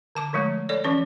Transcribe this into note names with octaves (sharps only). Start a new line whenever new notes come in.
D3 A5 D6
D3 F3 G#3 A3
A4 C#5 D5
E3 F3 C#4 D5